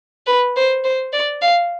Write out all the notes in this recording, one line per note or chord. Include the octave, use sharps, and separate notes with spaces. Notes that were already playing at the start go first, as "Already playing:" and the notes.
B4
C5
C5
D5
F5